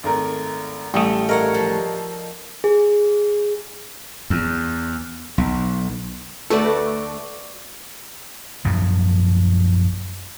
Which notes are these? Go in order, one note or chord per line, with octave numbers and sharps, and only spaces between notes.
G#1 A3 A#4
A1 G3 A3 G5 D#6
A4 A#4 C#5 D#5 F5 F#5
F3
G#4
E2
B1
D2 A3 F#4 A4 B4 D5
A#1 F#2 F3 F#3